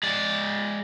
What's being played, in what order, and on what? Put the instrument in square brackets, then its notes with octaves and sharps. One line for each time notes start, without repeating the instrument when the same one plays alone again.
[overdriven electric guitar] G#3 D5